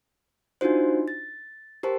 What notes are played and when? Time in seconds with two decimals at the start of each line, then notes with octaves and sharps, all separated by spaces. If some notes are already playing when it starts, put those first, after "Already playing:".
0.61 D4 D#4 F4 F#4 C5
1.08 A6
1.83 G4 A#4 C5 A5